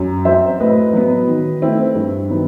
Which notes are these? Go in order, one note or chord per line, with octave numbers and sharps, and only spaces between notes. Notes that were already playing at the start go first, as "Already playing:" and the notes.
Already playing: F#2
F#3 C4 C5 E5
A2 B4 D#5
F#3 B3
D#3
A3 C4 E4
G2
D#3 F#3 B3